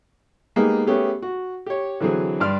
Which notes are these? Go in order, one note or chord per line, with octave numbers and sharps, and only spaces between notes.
G#3 A#3 B3 D#4 G4 G#4
A3 B3 C#4 G4 G#4
F#4
G4 C#5
D3 E3 F#3 C4 G#4
G2 D5 C6 F6